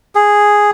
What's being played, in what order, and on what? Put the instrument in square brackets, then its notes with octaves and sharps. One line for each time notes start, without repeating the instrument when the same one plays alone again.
[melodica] G#4